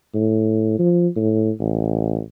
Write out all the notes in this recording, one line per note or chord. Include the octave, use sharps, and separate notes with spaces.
A2
F3
A2
A1